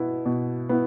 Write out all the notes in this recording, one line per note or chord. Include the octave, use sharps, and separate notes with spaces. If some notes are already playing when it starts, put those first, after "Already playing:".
Already playing: B2 B3 E4
B2
B3 E4